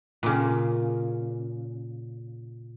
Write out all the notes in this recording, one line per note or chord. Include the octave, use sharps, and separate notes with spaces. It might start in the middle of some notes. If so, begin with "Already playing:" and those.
A#2 C#3